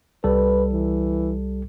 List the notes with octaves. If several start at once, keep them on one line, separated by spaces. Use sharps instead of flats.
C2 G3 A4 B4
E3